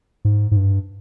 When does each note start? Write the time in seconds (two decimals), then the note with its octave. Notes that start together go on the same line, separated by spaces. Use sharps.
0.25 G#2
0.51 G#2
0.56 G2